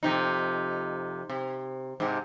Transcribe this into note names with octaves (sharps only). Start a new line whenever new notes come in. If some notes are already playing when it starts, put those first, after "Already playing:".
F2 C3 D#4
C3
G#2 C3